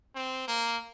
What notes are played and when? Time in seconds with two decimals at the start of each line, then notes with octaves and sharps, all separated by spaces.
0.15 C4
0.48 A#3